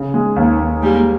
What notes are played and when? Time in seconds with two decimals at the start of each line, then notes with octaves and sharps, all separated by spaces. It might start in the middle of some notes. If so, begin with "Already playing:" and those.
Already playing: C#3
0.14 G#3
0.36 D#2
0.59 D#2
0.82 G3 G#3 A#3